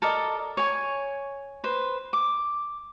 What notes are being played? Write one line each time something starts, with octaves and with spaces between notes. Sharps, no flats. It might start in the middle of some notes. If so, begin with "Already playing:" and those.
A4 A#4 D5 D#5
C#5 G#5
B4 C5
D6